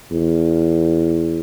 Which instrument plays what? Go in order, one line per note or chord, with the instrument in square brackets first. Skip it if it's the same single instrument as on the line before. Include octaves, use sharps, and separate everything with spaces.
[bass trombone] E2